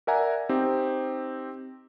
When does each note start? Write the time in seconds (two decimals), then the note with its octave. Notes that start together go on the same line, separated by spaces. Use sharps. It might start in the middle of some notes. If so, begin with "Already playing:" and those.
0.07 A#4 D5 E5 F#5 G#5 A#5
0.49 C4 D#4 G4